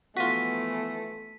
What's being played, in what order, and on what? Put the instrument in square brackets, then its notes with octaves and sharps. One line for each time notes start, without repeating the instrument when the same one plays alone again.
[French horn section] E3 F3 B3 [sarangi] A3 [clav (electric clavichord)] F4 F#4 [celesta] B6 D#7